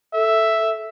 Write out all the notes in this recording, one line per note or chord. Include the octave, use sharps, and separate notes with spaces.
A4 E5